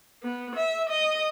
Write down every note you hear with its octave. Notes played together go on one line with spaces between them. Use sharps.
B3
E5
D#5